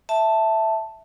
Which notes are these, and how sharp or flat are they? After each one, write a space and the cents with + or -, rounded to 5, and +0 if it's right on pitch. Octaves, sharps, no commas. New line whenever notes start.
E5 +0 A5 +0